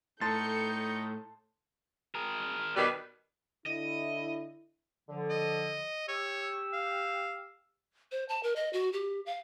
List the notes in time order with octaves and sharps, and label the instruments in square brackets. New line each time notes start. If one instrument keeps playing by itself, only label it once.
[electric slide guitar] A2 [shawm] D#4 [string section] A4 G6 C#7 [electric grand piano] A5 C6 A6
[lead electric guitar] G#4 A#4
[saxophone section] B2 D#3 G3 [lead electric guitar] B4
[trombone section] D3 E4 [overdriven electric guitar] D#5
[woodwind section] D3 F3
[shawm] D#5
[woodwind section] G4 E6 [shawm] C#5
[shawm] F5
[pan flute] C5
A5
A#4
D#5
F#4
G4
F5